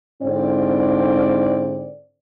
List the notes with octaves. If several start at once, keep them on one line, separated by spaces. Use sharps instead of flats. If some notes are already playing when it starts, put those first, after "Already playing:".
G#2 D3 C4 E4 D5